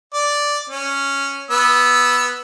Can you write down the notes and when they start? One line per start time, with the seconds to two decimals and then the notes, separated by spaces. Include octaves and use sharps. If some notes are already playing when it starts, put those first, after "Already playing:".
0.14 D5
0.70 C#4
1.51 B3 E6